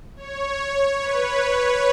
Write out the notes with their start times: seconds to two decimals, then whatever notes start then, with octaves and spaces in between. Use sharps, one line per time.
0.16 C#5
1.00 B4